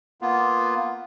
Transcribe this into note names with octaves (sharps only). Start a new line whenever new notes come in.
A#3 B3 F4